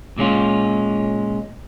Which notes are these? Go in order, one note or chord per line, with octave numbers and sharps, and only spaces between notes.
A#2 G#3 C#4 F4